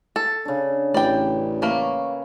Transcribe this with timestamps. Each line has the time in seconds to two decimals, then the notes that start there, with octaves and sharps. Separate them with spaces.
0.16 A4
0.45 C#3 D4
0.94 A1 B4 D5 G5
1.62 A3 A#3 B4 C#5